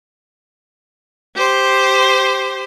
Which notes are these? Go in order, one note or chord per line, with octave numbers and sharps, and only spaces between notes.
G4 C5 C6